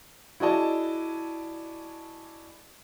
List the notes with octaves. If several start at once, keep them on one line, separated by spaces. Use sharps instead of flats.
E4 F#4 G#4 D5 D#5 A5